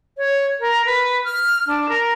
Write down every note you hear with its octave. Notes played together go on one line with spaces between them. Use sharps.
C#5
A#4
B4
F6
D4
A#4